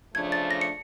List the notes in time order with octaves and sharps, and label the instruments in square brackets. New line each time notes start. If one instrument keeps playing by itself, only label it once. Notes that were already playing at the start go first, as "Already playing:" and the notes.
[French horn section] C#3 F3 A3 D4 [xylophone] G#6
[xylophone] A6
A#6
C#7